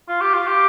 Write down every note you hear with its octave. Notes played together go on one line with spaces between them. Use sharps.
F4
G4
F4
G4